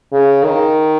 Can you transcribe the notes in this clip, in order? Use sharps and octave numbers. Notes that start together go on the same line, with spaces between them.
C#3
D#3